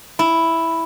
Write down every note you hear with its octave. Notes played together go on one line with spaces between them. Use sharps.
E4